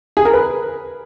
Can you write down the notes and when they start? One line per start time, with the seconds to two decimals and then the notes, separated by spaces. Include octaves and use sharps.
0.17 G#4
0.25 A#4
0.33 B4